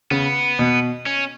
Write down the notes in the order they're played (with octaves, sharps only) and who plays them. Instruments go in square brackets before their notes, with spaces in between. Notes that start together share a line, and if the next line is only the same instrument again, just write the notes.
[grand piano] C#3 [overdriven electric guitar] B3
[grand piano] B2
[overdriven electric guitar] C#4